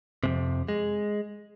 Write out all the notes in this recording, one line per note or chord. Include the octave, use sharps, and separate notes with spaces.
F2 G#2 C3
G#3